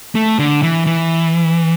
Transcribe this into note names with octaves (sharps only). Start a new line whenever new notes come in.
A3
D3
E3
E3